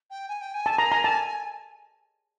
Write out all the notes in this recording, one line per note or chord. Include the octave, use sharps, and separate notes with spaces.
G5
G#5
G5
G#5
A5
A#5
A#5
A5